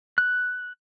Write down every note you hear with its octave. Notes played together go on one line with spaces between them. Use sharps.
F#6